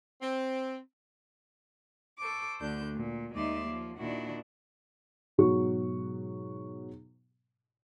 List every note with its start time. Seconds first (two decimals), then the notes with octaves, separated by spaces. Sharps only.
0.21 C4
2.19 A4 C5 C#6 D6
2.60 D2 D3 D4 G6
2.94 A#2
3.34 D#2 G#3 D#4 D5 E5 C6
3.67 F3 A#3
3.97 A#2 D#3 D4 E4 F#4
5.38 G#2 B2 F#3 F#4 C#6